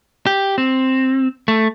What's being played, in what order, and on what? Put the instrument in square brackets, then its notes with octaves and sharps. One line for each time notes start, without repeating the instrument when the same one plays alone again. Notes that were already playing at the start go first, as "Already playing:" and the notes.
[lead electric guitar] G4
C4
A3